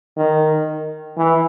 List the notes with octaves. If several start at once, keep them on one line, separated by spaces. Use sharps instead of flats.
D#3
E3